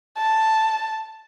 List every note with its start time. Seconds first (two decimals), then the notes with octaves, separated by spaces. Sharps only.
0.18 A5